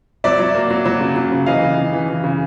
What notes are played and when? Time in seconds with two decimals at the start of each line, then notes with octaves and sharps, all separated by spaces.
0.24 F#3 D5 E5
0.39 F#3
0.55 A#3
0.71 F#3
0.86 F#3
1.01 C#3
1.16 F#3
1.32 C#3
1.46 E3 D#5 F5
1.63 C#3
1.78 C#3
1.93 E3
2.08 E3
2.24 C#3